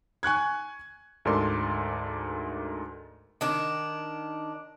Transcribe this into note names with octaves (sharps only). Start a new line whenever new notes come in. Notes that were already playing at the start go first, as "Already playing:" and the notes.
G#5 C#6 F#6 G#6
D2 G#2 A4 A#4 D5 C6
D#3 D4